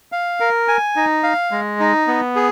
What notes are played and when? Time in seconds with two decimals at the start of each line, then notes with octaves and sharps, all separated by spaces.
0.12 F5
0.40 A#4
0.68 G#5
0.96 D#4
1.23 F5
1.51 G#3
1.80 D#4
2.07 B3
2.36 G#4